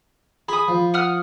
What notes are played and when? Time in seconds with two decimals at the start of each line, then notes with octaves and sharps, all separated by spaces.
0.48 G#4 B5 D#6
0.68 F3
0.94 F#5 D#6 F6